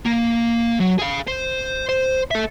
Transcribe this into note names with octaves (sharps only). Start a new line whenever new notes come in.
A#3
F#3
G#4 F5
C5
C5
A4 E5